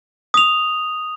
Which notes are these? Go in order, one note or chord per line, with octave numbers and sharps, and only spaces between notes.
D#6 F7